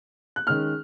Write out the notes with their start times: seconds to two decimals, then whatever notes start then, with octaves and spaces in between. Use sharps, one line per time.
0.36 F#6
0.47 D#3 G#3 C#4 F6